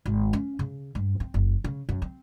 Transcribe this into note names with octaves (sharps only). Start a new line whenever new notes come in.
G#1
C#4
C#3
G2
C4
F#1
C#3
F#2
C4